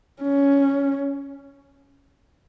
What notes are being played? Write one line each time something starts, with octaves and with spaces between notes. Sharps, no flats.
C#4